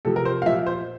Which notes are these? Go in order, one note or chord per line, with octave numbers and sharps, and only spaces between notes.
C3 F3 A4
A#4
C5
F5
A#2 F3 E5
C5